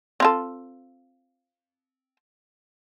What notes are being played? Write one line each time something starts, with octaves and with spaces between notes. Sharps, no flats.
C4 F4 A4